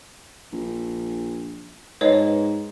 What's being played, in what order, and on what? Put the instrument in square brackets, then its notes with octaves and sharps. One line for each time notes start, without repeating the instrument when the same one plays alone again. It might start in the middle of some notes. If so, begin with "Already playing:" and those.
[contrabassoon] A#1
[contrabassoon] G#2 [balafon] B4 C#5 D#5